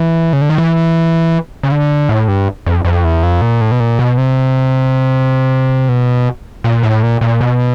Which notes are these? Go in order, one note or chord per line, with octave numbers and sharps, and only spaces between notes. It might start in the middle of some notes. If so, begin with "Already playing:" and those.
Already playing: E3
C#3
D3
D#3
E3
C#3
D3
A2
G2
F2
F2
E2
F2
A#2
A2
B2
A#2
B2
C3
B2
A#2
A2
A#2
A#2
B2